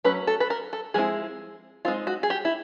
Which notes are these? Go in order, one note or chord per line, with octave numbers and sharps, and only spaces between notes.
F#3 A3 C#4 B4
A4
B4
A#4
A4
F3 G#3 C4 E4 G#4
G#3 C4 D#4 F4
F#4
G#4
G4
E4